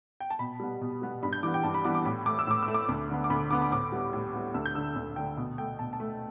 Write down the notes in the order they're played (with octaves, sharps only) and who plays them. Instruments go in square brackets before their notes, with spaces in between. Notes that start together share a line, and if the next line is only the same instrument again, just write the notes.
[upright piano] G5
A5
B2 B5
G3 B3
B2
G3 B3
G2 B5
G6
E3 G3 B3 D6
G5
G2 A5
B5
E3 G3 B3 D6
D6
A2 B5
A3 D6
E6
A2 D6
E6
A3
D6
D2
D3 B3
D6
D2 B5
D3 B3 D6
B5
A2 D6
G3 B3
A2
G3 B3
D2 E6
G6
D3 A3 E6
D2
D3 A3 G5
B2
A3 G5
B2 A5
A5
A3